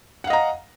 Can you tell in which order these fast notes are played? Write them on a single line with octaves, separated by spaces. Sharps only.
F#5 F5 D#5 A#5